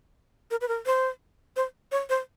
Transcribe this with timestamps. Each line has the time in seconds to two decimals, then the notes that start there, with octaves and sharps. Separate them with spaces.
0.51 A#4
0.61 B4
0.68 A#4
0.86 C5
1.56 C5
1.92 C#5
2.09 C5